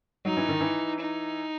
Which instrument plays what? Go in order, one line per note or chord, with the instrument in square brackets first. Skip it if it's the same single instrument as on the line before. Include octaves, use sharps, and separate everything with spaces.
[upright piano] F#3 [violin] D#4
[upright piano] E3
D#3
E3
[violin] D#4